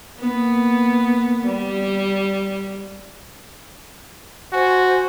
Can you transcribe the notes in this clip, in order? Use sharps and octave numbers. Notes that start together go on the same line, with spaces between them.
A#3 B3
G3
F#4 C5 G#5